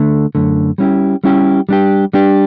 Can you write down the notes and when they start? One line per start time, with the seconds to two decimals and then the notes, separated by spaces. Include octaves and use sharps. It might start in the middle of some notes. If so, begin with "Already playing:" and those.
Already playing: D3 A3
0.35 F#2 D3 A3
0.78 G3 C#4 E4 G4
1.24 G3 C#4 E4 G4
1.69 G3 D4 G4
2.13 G3 D4 G4